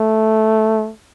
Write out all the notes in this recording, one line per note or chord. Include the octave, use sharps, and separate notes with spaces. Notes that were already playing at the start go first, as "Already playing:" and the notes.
Already playing: A3